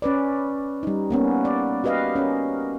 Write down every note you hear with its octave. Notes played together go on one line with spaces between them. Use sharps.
C#4 B4 D5
G3 D#4
A#3 B3 C#4
D5
F#4 G4 B4 D#5 F5
C#4 A#4